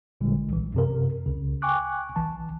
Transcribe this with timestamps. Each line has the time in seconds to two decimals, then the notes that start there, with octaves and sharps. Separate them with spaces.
0.21 A1 A#2 D3 G3 G#3
0.50 B1 E3
0.74 F#2 C3 A#4
1.26 C#2 C#3
1.62 G5 G#5 C#6 D6 F#6
2.16 A#1 E3 A5